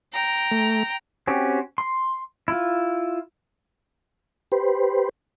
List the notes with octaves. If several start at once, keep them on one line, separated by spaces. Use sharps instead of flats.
G5 A#5
A3
C4 C#4 F#4 G4
C6
E4 F4
G4 B4 C5